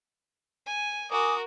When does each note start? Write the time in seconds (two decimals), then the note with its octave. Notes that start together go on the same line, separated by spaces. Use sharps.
0.66 G#5
1.11 F#4 A#4 G#5 D6 D#6